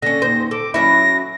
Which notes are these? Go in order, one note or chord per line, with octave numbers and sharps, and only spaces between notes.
D3 C#4 A#6
D#2 C5
A4 D6
F#3 C#4 E4 A#6